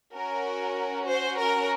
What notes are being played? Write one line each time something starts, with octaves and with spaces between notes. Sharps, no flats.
C#4 F#4 A#4
C5
A#4